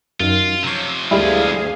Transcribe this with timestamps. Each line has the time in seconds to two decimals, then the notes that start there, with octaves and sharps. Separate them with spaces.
0.20 F#2 D#3 F4
0.64 C3 F3 C#5 C6 E6
1.11 D2 G3 G#3 E4 G#4 F5